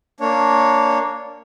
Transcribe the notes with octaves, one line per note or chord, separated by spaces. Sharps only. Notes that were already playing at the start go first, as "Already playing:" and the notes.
A#3 D4 C#5